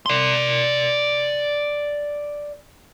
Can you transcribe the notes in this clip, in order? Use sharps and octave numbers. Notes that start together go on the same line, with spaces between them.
D5 C6